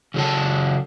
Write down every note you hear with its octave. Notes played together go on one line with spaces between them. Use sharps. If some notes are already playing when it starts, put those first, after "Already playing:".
C#3 F#3 A4 A5